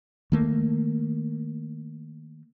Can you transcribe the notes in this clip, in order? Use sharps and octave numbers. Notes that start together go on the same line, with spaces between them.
D#3 A3 A#3